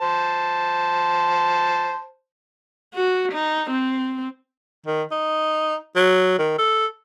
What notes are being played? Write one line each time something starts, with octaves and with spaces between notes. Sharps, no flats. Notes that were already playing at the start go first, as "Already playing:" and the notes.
C5 A5
F#4
D#4
C4
D#3
D#4
F#3
D#3
A4